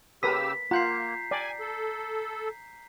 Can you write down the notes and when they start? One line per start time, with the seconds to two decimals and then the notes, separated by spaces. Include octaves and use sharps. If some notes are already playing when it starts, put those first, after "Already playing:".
0.23 C#3 G4 A#4 B4 D#6 E6 B6
0.71 A#3 F4 F#5 A#5 G6 C7
1.31 D5 G#5
1.60 A4